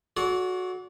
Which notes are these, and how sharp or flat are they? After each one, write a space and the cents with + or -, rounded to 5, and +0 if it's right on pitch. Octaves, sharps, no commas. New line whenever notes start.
F#4 -15 A4 -40 D5 -35